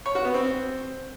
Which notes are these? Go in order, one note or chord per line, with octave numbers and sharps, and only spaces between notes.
C#5
F#4
B3
C4